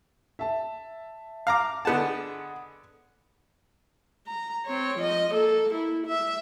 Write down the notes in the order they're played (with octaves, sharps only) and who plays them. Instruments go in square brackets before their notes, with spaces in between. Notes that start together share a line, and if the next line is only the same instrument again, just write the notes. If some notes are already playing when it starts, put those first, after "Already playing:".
[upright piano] E5 A5
[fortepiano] F5 A#5 D6
[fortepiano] D3 B3 A5 [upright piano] G#4 D#5 F#5
[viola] A#5
C4 C#5
F3 D#5
A#3 A4
E4
E5